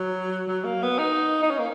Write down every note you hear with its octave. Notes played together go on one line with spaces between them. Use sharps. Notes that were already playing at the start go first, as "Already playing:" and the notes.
Already playing: F#3
F#3
A#3
B3
D#4
D#4
C#4
A#3